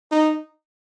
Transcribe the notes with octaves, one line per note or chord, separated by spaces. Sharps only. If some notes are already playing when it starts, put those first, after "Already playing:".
D#4